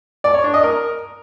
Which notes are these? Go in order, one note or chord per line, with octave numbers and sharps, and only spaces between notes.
D5
C#5
D4
D#5
A#4